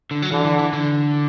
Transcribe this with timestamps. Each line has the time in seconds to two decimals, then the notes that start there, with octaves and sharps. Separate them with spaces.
0.11 D3
0.22 F#3
0.31 D3 E3
0.45 E3
0.59 E3
0.73 D3